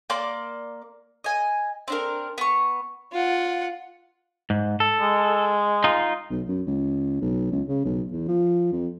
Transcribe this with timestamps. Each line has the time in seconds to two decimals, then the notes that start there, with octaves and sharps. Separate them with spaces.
0.10 A#3 D5 C6 D6
1.24 D#5 G#5
1.88 C4 D4 A#4
2.38 B3 C#6
3.12 F4 F#5
4.50 G#2
4.80 A4
5.01 G#3
5.84 D#4 F4
6.30 B1
6.48 F#2
6.67 C#2
7.21 B1
7.52 C#2
7.68 C#3
7.85 B1
8.12 E2
8.28 F3
8.72 F2